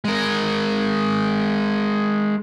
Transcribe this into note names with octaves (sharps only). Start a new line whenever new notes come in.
G#3 A#4